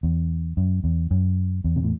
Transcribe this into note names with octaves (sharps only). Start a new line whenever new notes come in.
E2
F#2
E2
F#2
E2
C3
A2